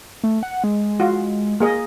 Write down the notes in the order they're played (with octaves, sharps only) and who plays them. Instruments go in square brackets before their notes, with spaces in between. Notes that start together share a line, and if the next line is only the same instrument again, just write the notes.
[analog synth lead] A3
F#5
G#3
[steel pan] F4 F#4
A#3 G#4 D#5